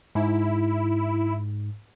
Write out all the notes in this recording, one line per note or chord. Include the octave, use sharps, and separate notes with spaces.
G#2 E4